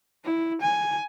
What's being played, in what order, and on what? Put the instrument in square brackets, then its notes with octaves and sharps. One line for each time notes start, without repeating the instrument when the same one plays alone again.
[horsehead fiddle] E4
G#5